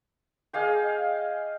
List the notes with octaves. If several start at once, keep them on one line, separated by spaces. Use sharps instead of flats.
G#4 D#5 F5 G5